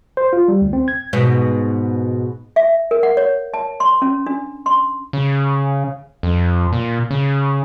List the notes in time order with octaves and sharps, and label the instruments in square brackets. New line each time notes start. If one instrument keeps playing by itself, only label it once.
[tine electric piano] C5
F4
G3
D2
C4
G#6
[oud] G#2 B2
[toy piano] E5
A#4
F#5
C#5
A5
C6
C#4
D4
C6
[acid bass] C#3
F2
A#2
C#3